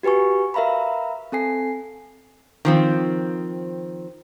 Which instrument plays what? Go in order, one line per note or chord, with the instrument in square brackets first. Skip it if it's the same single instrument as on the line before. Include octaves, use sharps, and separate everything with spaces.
[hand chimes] F#4 G4 B4 G#5 C#6
A#4 E5 F5 A#5 B5
C4 A4 G#5 C7
[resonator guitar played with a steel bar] D#3 F3 C4